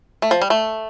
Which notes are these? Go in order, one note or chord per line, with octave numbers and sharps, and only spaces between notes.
A3
F3
G3
A3